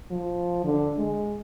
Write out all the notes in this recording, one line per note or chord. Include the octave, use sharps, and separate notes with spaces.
F3
D3
G#3